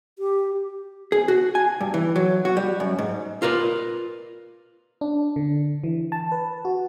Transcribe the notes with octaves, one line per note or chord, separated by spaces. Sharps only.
G4
G#4
F#4
G#5
G2
E3
F#3
F#4
G3
F#2
G#2
F4 A#4 B4 D5
D4
D3
E3
A5
B4
F#4